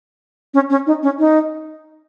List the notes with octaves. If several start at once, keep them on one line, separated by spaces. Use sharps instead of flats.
C#4
C#4
D#4
C#4
D#4